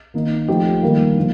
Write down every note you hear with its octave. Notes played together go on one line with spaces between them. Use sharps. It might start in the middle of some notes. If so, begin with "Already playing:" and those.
D#3 A#3 D#4
F3 A3 D#4 G4
D#3 G3 A#3
D3 F3 A#3